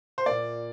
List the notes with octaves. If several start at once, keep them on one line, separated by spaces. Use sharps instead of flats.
C5
A#2 A#3 D5